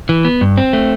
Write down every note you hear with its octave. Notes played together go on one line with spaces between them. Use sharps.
E3
B3
G2
C4
A3